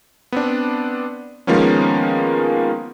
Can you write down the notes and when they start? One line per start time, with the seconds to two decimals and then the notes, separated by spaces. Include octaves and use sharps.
0.32 B3 C4 D4
1.47 D#3 F3 G#3 A#3 B3 C#4